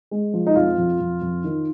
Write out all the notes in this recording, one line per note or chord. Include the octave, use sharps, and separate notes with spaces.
G#3
F3
D#4
F2 F4
F2
F2
F2
D#3